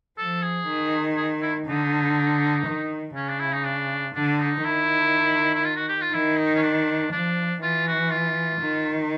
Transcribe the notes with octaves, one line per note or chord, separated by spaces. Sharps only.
F3 A4
G#4
D#3
G#4
E4
D3 D#4
D#3
C#3 C#4
D4
E4
D#4
D4
D3 D4
D#4
D#3 E4
E4
F4
F#4
G4
F4
D#3 E4
D#4
C#4
D4
F3 D4
E3 F4
F#4
F4
D#3